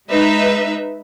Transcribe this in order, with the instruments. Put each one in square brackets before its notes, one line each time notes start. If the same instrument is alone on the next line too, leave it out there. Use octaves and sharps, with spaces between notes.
[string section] G#3 D#4 B4 E5